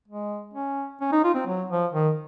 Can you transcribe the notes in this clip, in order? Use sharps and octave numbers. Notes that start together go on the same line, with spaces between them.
G#3
C#4
C#4
D#4
F4
C4
F#3
F3
D#3